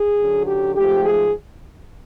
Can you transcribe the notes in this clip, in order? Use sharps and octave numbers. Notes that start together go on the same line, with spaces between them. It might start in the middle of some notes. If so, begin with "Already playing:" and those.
Already playing: G#4
F#2 D3 F#3
G4
G#2 F3 A3 G4
G#4